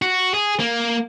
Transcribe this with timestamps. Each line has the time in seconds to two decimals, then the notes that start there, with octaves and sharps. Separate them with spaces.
0.02 F#4
0.34 G#4
0.60 A#3